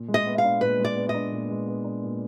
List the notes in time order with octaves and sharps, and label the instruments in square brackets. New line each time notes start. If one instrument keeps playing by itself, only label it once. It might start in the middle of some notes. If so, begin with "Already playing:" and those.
Already playing: [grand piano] A#2
G#3
[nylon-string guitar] D#5
[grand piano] B3
[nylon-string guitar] F5
[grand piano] D4
[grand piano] A#2 [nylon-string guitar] B4
[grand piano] G#3
[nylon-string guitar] D5
[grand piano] B3
[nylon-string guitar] D#5
[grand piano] D4
A#2
G#3
B3
D4
A#2